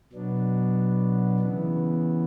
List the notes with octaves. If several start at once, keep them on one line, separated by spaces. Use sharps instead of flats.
B2 F#3 B3 D4
C#3 E3 B3